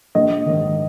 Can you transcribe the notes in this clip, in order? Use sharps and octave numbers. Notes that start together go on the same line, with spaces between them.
A#1 D#5
G#2 D#3